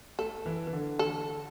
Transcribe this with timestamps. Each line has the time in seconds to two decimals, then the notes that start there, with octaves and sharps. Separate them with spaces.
0.19 A3 A4
0.46 E3
0.67 E3
0.73 D3
0.99 A4